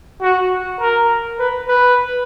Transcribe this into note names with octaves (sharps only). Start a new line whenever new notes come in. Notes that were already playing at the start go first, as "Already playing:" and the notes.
F#4
A#4
B4
B4